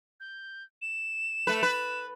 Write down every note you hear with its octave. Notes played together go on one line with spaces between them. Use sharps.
G6
E7
A3 B4
B4